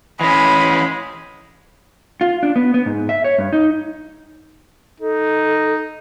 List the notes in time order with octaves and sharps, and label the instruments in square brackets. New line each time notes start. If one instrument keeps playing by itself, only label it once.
[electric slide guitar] E3 C#4 [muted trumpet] G#3 [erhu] B5
[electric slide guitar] F4
D4
B3
B3
G#2
E5
C#5
G2
D#4
[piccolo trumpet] D#4 [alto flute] A4